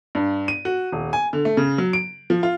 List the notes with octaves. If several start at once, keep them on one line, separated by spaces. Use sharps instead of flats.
G2
D#7
F#4
D#1
G#5
D3
A3
C#3
F#3
D7
F3
F4